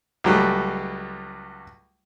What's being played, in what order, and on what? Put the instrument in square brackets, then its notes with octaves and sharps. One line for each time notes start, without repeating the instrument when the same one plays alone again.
[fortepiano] C#2 F#3 G3 A3